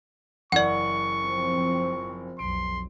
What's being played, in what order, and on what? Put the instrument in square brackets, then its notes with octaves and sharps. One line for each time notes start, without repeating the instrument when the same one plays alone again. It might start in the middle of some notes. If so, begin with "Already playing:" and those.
[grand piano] F#1 E3 F#7 [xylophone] D5 F#5 [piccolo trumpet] C#6
[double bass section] F3 C4
[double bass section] B1 F2 [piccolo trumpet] C6 [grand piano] D7